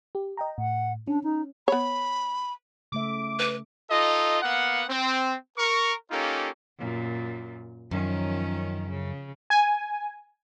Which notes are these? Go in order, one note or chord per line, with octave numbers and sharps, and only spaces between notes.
G4
D#5 G5 A#5
A2 F#5
C#4 D4
D#4
B3 C#5 B5
C#3 A3 E5 D6
B4
D#4 F4 A4 D#5
A#3 B3 F5 F#5
C4
A#4 C#6
A#3 C#4 D#4 F4 G4 A4
F#2 A#2
F#2 D#3 F3 C#4
C#3
G#5